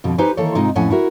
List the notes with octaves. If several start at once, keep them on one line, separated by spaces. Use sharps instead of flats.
F2 B2 D3
D#4 G4 B4 C5 G#5
D#3 E3 A#3 A4 C#5
G#2 C3 G#3 D#4 F4 D#5
F2 A2 F3 C#4 F#5 G#5
E4 F#4 A#4